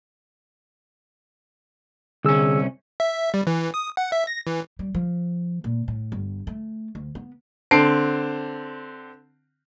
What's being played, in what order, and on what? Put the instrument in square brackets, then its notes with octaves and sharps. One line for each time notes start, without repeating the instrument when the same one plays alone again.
[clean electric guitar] C2 C#4 [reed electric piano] D3 G#4 E6
[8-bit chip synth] E5
G3
E3
D#6
F#5
E5
A#6
E3
[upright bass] G3
F3
A#2
A2
G1
A3
D2
B3
[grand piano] D3 C4 A5 C7 D7